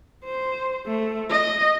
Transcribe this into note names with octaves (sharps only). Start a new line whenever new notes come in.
C5
A3
D#5